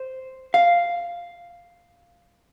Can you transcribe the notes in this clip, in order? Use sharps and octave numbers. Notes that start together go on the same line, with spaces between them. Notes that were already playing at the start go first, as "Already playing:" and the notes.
Already playing: C5
F5